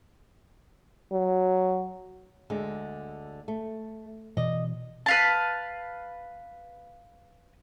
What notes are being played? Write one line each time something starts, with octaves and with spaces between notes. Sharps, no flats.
F#3
D2 D3 G#3
A3
B2 E3 D5 D#5
B4 F5 A5